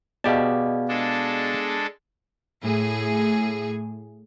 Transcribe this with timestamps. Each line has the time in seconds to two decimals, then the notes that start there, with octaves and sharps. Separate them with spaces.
0.24 B2 B3 G4 G#4 D5 D#5 F5 A5
0.88 G#3 D4 A4
2.63 A2 G#4